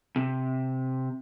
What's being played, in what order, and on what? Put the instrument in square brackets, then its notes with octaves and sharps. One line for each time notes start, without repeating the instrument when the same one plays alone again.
[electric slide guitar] C3